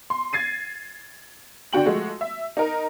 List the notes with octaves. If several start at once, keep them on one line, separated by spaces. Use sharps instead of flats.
C6
G#6 A6 C7 D#7
D3 D4 F#4 G5 F#7
F3 G#3 A3 F#4
E5
D#4 A#4